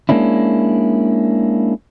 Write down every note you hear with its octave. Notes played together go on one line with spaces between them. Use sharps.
G#3 A#3 C#4 D4 E4